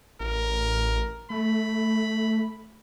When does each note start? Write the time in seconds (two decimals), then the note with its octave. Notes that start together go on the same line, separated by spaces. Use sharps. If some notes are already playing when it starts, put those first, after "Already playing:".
0.20 A1 A#4
1.30 A3 B5